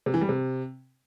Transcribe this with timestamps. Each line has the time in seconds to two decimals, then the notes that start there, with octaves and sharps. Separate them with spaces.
0.06 C3
0.14 E3
0.21 G3
0.29 C3